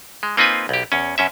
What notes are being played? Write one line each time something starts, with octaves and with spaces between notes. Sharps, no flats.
G#3
A#3 C4 D#4 F4 B4 G#5
B1 G4
E2 C#4
F#2 C#4 E5